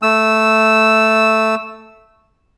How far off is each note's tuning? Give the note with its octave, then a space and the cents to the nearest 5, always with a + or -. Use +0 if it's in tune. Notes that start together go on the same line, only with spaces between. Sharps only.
A3 +0 E6 -5